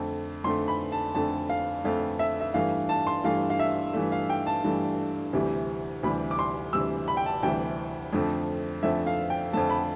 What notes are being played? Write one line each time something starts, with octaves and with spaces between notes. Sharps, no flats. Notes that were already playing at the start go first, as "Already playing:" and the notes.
Already playing: F2 D3 A3
F2 D3 A3 C6
B5
A5
F2 D3 A3 A5
F5
F2 D3 A3 F5
E5
E5
G2 E3 A3 F5
A5
C6
G2 E3 A3 F5
F5
E5
G2 E3 A3
F5
G5
A5
G2 E3 A3
D2 C3 E3 G3
D2 C3 E3 G3 B5
D6
C6
D2 C3 E3 G3 E6
B5
G5
A5
D2 C3 E3 G3 G5
F2 D3 F3 A3
F2 D3 F3 A3 E5
F5
G5
F2 D3 F3 A3 A5
B5